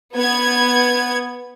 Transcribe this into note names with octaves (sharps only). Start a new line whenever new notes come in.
B3 G#6